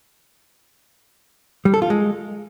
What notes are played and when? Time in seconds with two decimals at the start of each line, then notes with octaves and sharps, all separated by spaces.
1.65 G3
1.74 A4
1.82 F4
1.90 G#3